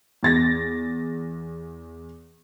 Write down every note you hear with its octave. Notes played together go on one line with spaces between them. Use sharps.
E2 A6 A#6